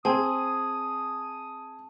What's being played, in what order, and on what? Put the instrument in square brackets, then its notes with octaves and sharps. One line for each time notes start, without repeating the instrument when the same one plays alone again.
[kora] C4 [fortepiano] G#4 [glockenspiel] A5 [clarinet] D#6